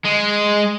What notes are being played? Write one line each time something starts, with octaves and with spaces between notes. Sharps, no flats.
G#3